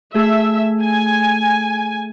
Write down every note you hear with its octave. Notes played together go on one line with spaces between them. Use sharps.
A3 G#4 E5
G#5